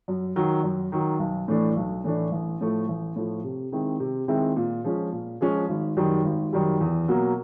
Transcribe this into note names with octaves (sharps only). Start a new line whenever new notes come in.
F#2
D#3 F#3
F#2
D#3 F#3
B1
A2 E3 A3 D4
B1
A2 E3 A3 D4
A1
A2 F3 A3
A1
A2 F3 A3
C3
D#3 G#3 C4 E4
C3
D#3 G#3 C4 E4
A#2
F3 G#3 C#4
A#2
F3 G#3 C#4
G#1
F#2 D#3 G3
G#1
F#2 D#3 G3
E2
B2 F#3 A#3